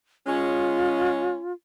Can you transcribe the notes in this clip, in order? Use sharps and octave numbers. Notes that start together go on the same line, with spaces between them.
G#3 C#4 F4